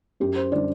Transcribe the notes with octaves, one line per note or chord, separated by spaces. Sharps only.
F#2 G4
C5
D3 G3 D5